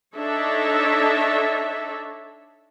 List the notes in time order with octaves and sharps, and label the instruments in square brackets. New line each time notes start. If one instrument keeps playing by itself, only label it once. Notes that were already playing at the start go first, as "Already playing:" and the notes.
[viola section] D4 D#4 A4 C#5 E5